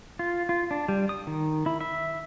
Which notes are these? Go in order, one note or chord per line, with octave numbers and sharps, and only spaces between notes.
F4
F4
D4
G3
D#6
D#3
E4
E5